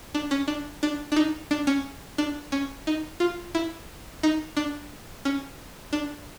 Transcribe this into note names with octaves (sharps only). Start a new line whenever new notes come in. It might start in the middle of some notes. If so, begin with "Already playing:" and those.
D4
C#4
D4
D4
D4
D#4
D4
C#4
D4
C#4
D#4
F4
E4
D#4
D4
C#4
D4